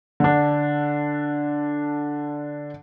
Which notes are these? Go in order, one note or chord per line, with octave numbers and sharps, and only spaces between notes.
D3 D4